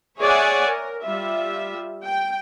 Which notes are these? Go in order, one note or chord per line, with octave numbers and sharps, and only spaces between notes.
G#4 C#5 D5 E5 F#5 G#5
A#4
G3 F4 E5
G5